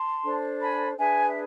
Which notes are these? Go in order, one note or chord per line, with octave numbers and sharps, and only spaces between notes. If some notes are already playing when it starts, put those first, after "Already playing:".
Already playing: A5 C6
D4 A4 C5
G#5 B5
D4 G#4 B4 E5 G#5
E5